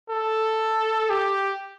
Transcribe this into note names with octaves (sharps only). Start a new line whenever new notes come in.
A4
G4